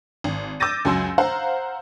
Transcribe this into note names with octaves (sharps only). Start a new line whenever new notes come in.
G#1
D6 E6 G6 A6 A#6 D#7
C#2 F#2 F#3 G#5 C6 E6
C5 F5 F#5 A#5